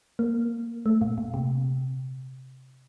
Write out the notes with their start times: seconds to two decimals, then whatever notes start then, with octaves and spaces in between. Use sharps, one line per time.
0.19 A#3
0.86 A3
1.01 A#2
1.18 A#2
1.34 C3